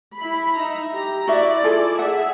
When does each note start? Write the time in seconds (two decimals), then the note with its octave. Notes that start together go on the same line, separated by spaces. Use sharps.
0.16 E4 B5
0.58 D#4 E5 A#5
0.91 G4 A#5
1.28 E4 F#4 D5 E5
1.64 F4 G#4 A4
1.99 G#4 E5 F#5